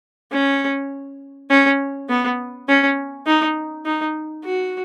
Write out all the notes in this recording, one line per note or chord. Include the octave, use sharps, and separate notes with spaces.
C#4
C#4
B3
C#4
D#4
D#4
F#4